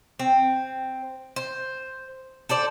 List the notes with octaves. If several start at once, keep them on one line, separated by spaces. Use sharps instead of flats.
C4
C5
A4 C5 D5